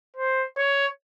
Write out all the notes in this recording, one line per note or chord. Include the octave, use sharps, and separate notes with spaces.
C5
C#5